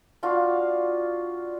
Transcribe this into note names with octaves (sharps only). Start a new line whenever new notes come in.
D4 F4 F#4 F5